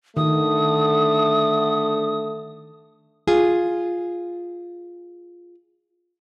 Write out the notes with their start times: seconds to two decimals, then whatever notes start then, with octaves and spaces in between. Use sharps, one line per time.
0.17 D3 D#3 A3 D#6
3.28 F4 G#4